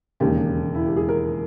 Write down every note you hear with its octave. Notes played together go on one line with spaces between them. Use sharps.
E1 D#2 C#3 G4
E4
G4
G#4
A#4